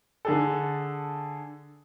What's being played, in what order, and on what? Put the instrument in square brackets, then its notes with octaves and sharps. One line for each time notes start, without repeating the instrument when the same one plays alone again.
[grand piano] D3 G#4 A4